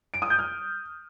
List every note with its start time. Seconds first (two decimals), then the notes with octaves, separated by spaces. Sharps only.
0.14 D7
0.22 D#6
0.30 G6
0.39 F6